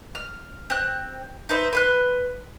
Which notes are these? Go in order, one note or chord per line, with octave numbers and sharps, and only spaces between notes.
F6
C4 F#6
D#4 B4 C5 E5
B4 C6 F#6